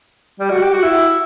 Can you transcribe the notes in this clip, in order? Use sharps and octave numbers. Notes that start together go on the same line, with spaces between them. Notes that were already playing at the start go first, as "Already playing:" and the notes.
G3
F#4
G4
F#4
E4